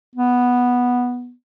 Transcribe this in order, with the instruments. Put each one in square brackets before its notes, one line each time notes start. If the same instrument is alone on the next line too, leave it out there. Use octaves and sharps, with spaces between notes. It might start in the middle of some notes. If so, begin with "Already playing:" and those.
[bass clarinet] B3